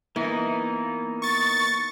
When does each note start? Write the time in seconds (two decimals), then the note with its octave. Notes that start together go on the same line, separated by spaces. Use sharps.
0.16 E3 A#3 B3 D#4
1.22 C#6 A6